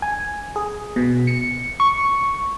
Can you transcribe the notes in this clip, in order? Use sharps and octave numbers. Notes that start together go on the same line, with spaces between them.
G#5
G#4
B2
C#7
C#6